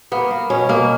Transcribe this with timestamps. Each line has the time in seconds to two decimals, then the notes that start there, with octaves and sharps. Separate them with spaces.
0.12 A#3 B3
0.31 A#3
0.50 B2 C#4
0.69 B2 A#3